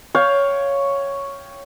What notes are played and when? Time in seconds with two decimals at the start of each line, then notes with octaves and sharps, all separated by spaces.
0.15 C#5 F5 G5